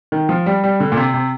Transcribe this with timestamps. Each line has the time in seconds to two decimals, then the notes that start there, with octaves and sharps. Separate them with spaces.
0.12 D#3
0.29 F3
0.46 G3
0.64 G3
0.80 D3
0.92 A#2
0.97 C3
1.14 C3